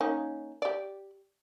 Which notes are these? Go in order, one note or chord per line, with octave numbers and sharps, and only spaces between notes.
A#3 C#4 D#4
G4 D5